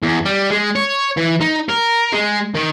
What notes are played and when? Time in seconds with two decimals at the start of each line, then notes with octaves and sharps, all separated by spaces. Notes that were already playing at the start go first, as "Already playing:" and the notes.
0.03 E2
0.25 G3
0.50 G#3
0.76 C#5
1.17 E3
1.41 D#4
1.69 A#4
2.13 G#3
2.54 D#3